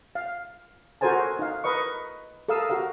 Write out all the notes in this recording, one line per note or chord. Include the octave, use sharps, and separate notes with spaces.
F5
F#4 A4 A#4 C5 G#5 A5
D#4 F5
A#4 B4 D#5 C#6
A4 A#4 F5 D#6 E6
F#4 G4 A#4 F5